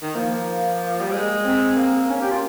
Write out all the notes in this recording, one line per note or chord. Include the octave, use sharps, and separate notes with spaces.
D#3
F3 A#3
G3
G#3
C4
A#3
C#4
G4
F4